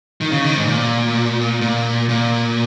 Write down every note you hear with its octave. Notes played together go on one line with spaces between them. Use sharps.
D#3
C#3
D#3
G#2
A#2
A#2
A#2